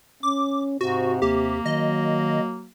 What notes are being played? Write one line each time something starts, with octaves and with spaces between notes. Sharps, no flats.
C#4 D6
G#2 C3 F#4
D#2 A#3 G4
D#3 F#3 D#5